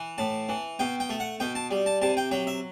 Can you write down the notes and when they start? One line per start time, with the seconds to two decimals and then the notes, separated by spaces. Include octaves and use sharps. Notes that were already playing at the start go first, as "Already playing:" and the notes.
Already playing: E3
0.18 A2 A5
0.49 E3
0.79 B2 G5
1.00 G5
1.10 A3
1.20 F#5
1.40 B2 G5
1.55 A5
1.71 G3
1.86 A5
2.02 C3 A5
2.17 G5
2.31 F#3 G5
2.47 E5